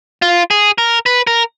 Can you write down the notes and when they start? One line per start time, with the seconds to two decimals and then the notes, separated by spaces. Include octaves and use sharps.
0.22 F4
0.51 G#4
0.78 A#4
1.06 B4
1.27 A#4